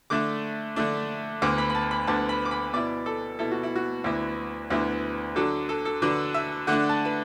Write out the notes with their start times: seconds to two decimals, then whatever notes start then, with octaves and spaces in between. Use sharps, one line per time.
0.10 D3 A3 D4 D6
0.76 D3 A3 D4
1.42 D2 D3 B3 D6
1.58 B5
1.70 B5
1.75 A5
1.91 B5
2.07 D2 D3 B3 A5
2.29 B5
2.45 D6
2.51 B5
2.73 B2 B3 E4 D5
3.06 A4
3.39 B2 B3 E4 A4
3.51 F#4
3.63 E4
3.75 F#4
4.04 D2 D3 B3 E4
4.70 D2 D3 B3 E4
5.36 D3 F#3 D4 A4
5.69 A4
5.85 A4
6.02 D3 F#3 D4 B4
6.34 E5
6.67 D3 A3 D4 F#5
6.89 A5
7.05 B4